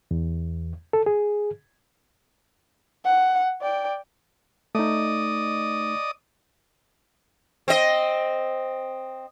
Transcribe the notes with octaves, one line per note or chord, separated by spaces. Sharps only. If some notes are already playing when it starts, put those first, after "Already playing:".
E2
A4
G#4
F#5
D5 G5
A3 D#4 D5 D#5 D#6
C4 D#5